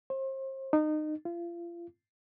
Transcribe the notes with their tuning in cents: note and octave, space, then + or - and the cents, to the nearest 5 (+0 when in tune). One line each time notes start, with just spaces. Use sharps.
C5 +35
D#4 -25
F4 -35